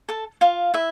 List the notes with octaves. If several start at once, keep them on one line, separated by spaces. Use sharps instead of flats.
A4 A5
F4 F5
E4 E5